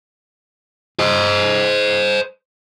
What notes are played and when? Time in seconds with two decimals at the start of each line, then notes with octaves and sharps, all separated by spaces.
1.00 C5 D#5